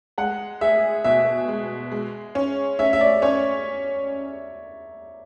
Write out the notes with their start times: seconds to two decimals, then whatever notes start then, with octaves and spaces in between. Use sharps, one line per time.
0.18 G#3 F#5
0.61 G#4 E5
1.04 B2 E5
1.48 G#3
1.92 G#3
2.35 C#4
2.79 C#4 E5
2.93 E5
3.01 D5
3.22 C#4 C#5